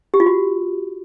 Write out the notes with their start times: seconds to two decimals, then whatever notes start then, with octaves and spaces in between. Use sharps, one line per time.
0.14 G4
0.20 F4
0.26 F#4